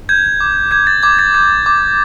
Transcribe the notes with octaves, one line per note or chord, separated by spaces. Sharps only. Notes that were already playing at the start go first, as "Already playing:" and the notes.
G6 G#6
D6
G6 G#6
A6
D6 G#6
A6
G6
D6